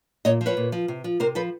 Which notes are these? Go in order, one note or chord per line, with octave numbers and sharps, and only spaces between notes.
A#2 C#5 D#5
F3
B4 C#5
A#2
F3
C3
F3
C3 A#4 C5
F3 A4 B4